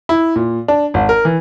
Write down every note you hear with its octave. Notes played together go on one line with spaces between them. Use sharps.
E4
A#2
D4
G#1
A#4
E3